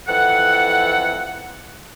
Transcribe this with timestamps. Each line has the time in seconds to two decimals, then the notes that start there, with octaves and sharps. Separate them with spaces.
0.08 F2 E3 A4 F#5